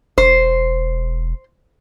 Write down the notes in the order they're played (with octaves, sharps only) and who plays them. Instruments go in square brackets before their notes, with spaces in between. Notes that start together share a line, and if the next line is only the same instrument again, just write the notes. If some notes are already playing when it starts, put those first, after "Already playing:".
[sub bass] E1 [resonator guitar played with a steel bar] C5